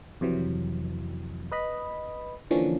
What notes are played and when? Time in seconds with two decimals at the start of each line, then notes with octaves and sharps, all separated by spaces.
0.21 F2 C3 E3 F#3
1.52 B4 D#5 B5
2.51 D3 E3 F3 A#3 C#4 D4